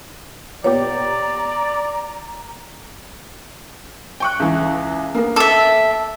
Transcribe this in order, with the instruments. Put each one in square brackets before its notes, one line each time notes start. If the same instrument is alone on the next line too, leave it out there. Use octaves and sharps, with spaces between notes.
[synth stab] A#2 B3 G4 [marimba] C#5 [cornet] D5 [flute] A#5
[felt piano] G5 C#6 F#6
C#2 E3
A#3 B3 A#4
[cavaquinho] A4 E5 [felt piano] D6